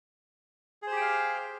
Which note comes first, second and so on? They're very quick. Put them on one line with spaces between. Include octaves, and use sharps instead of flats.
G#4 C5 G4 G5 F5